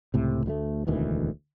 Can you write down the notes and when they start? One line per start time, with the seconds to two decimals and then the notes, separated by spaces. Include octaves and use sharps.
0.14 C#2 A2 C3
0.46 D2 G3 A3
0.87 E1 D2 D#3 E3